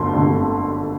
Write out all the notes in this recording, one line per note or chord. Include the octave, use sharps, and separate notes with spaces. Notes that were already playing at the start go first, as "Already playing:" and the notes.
Already playing: G1 F2 D3 C6
G1 F2 D3